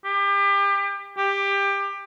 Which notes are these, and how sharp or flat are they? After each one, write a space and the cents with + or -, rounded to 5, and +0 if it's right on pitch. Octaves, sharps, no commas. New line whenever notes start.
G4 +30
G4 +20